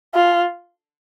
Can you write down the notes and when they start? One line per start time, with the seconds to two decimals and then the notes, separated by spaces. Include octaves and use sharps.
0.14 F4